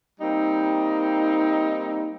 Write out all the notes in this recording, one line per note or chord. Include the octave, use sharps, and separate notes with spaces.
G3 A#3 C4 D#4